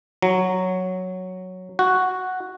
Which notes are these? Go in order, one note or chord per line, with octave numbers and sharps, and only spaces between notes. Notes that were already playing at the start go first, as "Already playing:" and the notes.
F#3
F#4